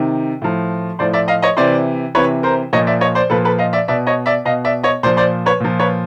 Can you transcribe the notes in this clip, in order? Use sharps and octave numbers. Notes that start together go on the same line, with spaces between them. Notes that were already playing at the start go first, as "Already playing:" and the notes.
Already playing: C3 D#3
A2 F3
A2 F3 C5 D5
D5 E5
D#5 F5
C#5 D#5
C3 E3 C5 D5
C3 E3 B4 C#5
A#4 C5
A#2 F3 C#5 D#5
D5 E5
C#5 D#5
C5 D5
A#2 F3 A4 B4
A4 B4
D#5 F5
D5 E5
B2 D5 E5
C#5 D#5
D5 E5
B2 D#5 F5
D5 E5
C#5 D#5
A#2 F3 C5 D5
C5 D5
B4 C#5
A#2 F3
B4 C#5